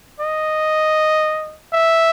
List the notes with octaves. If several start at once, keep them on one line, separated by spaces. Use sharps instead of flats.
D#5
E5